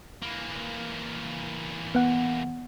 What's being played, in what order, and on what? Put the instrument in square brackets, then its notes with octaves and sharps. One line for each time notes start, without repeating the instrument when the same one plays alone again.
[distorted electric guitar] E3 A#3
[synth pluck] B3 F#5